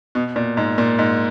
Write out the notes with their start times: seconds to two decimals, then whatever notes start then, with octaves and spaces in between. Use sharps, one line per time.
0.15 B2
0.36 A#2
0.57 G#2
0.78 A#2
0.99 G#2